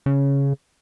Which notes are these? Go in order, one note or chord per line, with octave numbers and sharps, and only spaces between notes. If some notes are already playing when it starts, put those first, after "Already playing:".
C#3